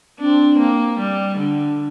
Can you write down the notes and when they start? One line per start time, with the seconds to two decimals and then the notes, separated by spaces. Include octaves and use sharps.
0.19 C4 D4
0.58 A#3
0.98 G3
1.37 D3